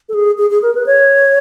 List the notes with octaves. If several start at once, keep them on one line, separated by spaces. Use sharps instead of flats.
A4
G#4
G#4
G#4
A#4
B4
C#5